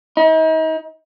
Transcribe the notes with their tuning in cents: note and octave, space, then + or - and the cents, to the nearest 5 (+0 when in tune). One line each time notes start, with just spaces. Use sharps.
D#4 +40